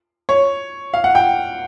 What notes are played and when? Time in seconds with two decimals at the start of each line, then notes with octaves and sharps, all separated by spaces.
0.29 C#5
0.94 F5
1.04 F#5
1.15 G5